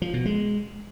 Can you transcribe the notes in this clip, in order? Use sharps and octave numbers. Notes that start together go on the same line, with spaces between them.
F3
B2
G#3